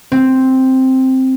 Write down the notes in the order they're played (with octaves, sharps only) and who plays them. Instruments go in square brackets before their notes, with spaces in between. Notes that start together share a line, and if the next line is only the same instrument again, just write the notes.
[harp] C4